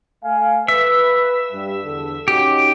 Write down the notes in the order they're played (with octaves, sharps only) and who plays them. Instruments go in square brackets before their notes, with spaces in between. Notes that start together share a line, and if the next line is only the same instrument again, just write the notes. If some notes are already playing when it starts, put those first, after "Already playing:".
[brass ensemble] A3 F5 G#5
[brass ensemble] B4 [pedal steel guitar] E5
[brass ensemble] G2
E2 D3 A4
[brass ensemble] C#4 D#4 F#4 [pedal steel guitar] G4